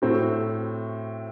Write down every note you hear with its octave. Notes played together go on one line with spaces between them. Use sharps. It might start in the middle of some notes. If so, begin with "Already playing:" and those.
A2 A3 C4 F#4